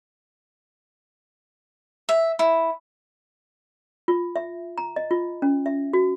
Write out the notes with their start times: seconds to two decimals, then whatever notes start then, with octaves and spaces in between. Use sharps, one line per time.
2.09 E5
2.39 E4
4.08 F4
4.36 E5
4.78 A#5
4.96 D#5
5.11 F4
5.42 C#4
5.66 E5
5.93 F#4